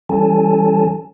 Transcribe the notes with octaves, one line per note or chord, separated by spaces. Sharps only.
E3 G3 C#4 A4 G#5 A5